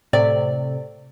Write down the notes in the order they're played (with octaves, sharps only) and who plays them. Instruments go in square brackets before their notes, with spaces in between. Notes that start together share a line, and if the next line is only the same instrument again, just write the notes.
[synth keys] A2 C3 [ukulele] D5